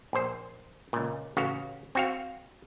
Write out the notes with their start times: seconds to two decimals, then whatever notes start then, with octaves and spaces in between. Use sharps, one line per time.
0.13 A#1 C5
0.93 C#2 A#2
1.37 A1 C#3 F#4 F5
1.95 C4 F#4 F5